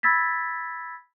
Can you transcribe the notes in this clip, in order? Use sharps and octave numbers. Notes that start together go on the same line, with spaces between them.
B5 E6 G#6 A6 B6